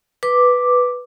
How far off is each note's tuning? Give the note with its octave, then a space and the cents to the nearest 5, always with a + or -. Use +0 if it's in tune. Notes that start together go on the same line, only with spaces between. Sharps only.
B4 +0 D6 +0